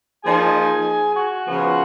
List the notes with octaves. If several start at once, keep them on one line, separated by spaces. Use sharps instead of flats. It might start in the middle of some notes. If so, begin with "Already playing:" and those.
F3 A#3 D#4 G#4 G#5
F#4 F#5
C#3 F3 B3